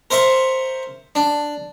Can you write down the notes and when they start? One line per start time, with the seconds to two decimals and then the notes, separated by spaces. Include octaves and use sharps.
0.11 A#4 C5 E5 C#6
1.15 D4